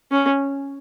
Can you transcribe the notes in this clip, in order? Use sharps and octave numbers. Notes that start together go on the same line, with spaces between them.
C#4